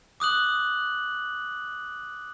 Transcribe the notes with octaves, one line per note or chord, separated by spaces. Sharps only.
D6 D#6 F#6 F#7